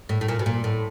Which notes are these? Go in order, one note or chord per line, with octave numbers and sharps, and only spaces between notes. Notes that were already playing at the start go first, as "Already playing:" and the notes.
A2
A2
A#2
B2
A#2
A2